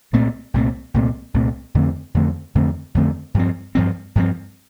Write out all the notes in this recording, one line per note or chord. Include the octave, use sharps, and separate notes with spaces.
C2 A#2 A3 C4
C2 A#2 A3 C4
C2 A#2 A3 C4
C2 A#2 A3 C4
F2 D3 A3 C4
F2 D3 A3 C4
F2 D3 A3 C4
F2 D3 A3 C4
G2 F3 C4
G2 F3 C4
G2 F3 C4